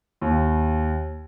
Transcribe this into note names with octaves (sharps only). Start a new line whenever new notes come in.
D#2